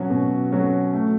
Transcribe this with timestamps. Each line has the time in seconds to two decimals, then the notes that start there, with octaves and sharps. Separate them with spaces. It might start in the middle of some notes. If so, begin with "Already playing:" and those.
Already playing: B2 F#3 C#4 F#4
0.10 B2
0.52 F#3 C#4 F#4
0.93 A3